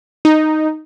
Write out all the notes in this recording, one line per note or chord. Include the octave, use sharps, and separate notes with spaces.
D#4